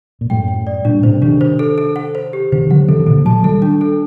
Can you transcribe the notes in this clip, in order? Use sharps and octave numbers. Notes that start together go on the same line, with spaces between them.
A#2
F#2 A2 G5
G5
D5
G2 A#2 D4
A2 C3 C5
C3 D#3 D4
C5
A4
A4
F#5
C5
G4
C3 D#3 C5
D3 F#3 F#5
C3 D#3 A4
D#3
A#2 D3 A4
F#3 A3 A5
D#3 G3 A4
D4
A4